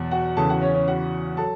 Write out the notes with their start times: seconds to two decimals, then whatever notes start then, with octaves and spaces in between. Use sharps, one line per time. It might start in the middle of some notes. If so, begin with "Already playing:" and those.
Already playing: E2 B2 F#3
0.11 F#4 F#5
0.37 E2 C#3 E3 A4 A5
0.49 F#4 F#5
0.61 C#4 C#5
0.74 C#4 C#5
0.88 F#4 F#5
1.37 F#3 A4 A5